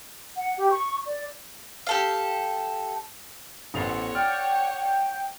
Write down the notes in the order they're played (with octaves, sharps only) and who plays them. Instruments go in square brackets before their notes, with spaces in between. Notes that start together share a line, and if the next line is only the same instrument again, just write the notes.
[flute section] F#5
G4
C#6
D5
[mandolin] G4 A4 F5
[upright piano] A1 F7 [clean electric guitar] B3 A4 C5 [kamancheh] C#5 F#5
[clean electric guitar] D5 [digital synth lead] G5 [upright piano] F6